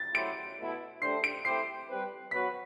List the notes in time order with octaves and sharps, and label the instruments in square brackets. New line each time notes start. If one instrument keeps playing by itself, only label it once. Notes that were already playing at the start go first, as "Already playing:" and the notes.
Already playing: [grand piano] A6
[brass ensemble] F#3 A3 E4 G4 C5 [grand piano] D7
[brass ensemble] B2 A3 E4
[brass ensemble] A3 D4 G4 C5 [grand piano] C7
[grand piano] D7
[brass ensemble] A3 C4 E4 G4 C5 [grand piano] C7
[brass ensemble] G3 C4 G4 B4
[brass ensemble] F#3 B3 F#4 B4 [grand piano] B6